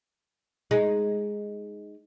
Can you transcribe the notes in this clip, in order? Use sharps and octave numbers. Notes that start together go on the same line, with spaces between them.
G#3 D#4